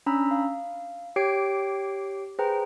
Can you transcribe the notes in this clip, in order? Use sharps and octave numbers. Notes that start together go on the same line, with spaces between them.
C#4 D4 A#5 B5 E6
F5
G4 C#5 G5 D6 C7 D7
G#4 B4 C5 G5 A#5